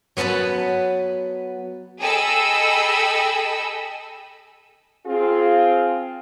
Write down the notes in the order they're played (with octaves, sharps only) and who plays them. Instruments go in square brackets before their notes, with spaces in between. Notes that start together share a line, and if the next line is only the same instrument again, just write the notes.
[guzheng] F#3 B3 B4 A5 B5
[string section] G#4 A4 D#5 G5 B5 E6
[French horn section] C4 F4 G#4